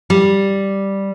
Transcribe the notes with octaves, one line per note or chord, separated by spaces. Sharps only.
G3